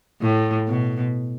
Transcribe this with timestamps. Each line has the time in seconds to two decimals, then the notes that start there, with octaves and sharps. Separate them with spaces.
0.21 A2
0.68 B2